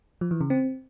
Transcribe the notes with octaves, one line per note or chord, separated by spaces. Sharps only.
F3
E3
C#3
C4